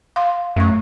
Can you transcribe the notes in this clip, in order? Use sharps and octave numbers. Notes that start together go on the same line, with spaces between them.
F5 C6
F#2 A3 C#6